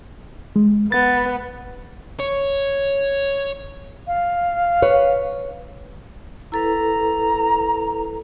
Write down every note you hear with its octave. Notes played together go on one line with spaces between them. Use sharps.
G#3
B3 A6
C#5
F5
B4 C#5
E4 A4 B4 A#5